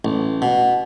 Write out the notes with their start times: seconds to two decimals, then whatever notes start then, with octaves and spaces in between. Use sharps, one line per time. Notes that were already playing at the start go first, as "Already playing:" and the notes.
0.05 A1
0.42 B2